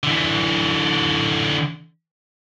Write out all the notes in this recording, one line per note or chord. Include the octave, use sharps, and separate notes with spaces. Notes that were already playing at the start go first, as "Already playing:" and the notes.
D3 E3